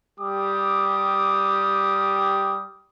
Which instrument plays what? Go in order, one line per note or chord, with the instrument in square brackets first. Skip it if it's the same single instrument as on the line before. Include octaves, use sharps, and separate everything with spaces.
[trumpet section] G3 G4 D6 D#6